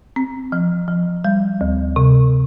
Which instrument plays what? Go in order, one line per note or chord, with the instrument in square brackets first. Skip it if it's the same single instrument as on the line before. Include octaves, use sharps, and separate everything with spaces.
[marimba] C4
F3
F3
G3
D2
C3